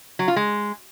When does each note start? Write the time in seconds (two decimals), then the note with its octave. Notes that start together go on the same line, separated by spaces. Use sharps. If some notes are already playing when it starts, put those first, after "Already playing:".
0.19 F#3
0.28 F4
0.36 G#3